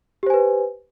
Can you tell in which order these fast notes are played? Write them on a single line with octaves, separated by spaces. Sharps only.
G4 C5 G#5 B4